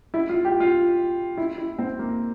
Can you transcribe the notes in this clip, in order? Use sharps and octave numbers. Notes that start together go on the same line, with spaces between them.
E4
F4
G4
F4
E4
E4
C4
A#3